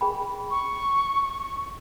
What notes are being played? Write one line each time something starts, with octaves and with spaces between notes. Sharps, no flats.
G#4 G5 B5
C#6